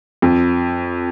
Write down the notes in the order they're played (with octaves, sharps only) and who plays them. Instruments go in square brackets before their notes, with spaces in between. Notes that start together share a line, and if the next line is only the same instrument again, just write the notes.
[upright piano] F2